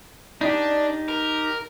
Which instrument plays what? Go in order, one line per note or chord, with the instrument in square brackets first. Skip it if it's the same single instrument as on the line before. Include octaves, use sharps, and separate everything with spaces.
[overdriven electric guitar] D4 [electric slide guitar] D#4 G4
[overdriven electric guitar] A#4